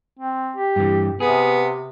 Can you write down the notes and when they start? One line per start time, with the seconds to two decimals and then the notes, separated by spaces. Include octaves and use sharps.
0.19 C4
0.56 G4
0.76 G2 E3
1.20 C3 B3 G#4